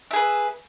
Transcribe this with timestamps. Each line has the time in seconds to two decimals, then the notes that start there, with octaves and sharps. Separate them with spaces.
0.11 E5
0.13 G#4
0.16 B4